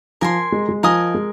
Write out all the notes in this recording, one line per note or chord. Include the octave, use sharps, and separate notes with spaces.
F3 A#4 G#5 C6
G#3
G#3
F3 A#4 D#5 G#5 D#6
G#3